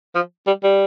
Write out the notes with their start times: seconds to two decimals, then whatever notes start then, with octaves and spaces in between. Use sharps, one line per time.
0.15 F3
0.47 G3
0.63 G3